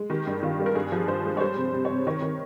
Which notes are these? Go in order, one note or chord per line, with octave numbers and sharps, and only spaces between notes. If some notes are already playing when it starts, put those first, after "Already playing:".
Already playing: G#3
D#3 G4
G2
D#3 F4
G3
A#4
G2 G#4
F3
G2 C5
G#3
C#5
G3 C5
C3
C3
C#5
C3
D#3 C#5
D#3